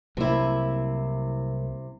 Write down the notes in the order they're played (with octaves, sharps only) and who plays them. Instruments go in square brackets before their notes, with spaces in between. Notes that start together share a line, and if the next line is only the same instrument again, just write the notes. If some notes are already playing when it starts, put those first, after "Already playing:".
[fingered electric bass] C2 F#3 A#3 [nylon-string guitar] C3 E4